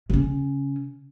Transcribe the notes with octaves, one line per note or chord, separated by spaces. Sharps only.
C#3 C#4